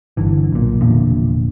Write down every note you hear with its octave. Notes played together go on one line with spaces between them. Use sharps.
G1 D3 E3
B1 A#2
F1 E2 A#2 D3